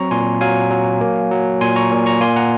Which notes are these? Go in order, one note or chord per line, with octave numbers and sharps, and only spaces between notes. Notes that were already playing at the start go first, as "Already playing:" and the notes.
Already playing: F#3 C4 A#5 C#6
A#2 G#5 C6
F#3 F5 G#5
F#3
A#3
F#3
A#2 G#5 C6
A#5 C#6
A#2
A#5 C#6
A#3 G#5 C6
F#5 A#5